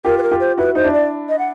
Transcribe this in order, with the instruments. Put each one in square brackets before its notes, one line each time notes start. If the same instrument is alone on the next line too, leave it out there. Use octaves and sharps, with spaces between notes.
[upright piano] F4 G4 [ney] A#4
[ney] B4
A#4
[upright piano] F4 G4
[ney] C5
[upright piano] E4 F#4 [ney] B4
[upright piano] D#4 [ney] C5
[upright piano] D4 E4
[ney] D5
D#5
F#5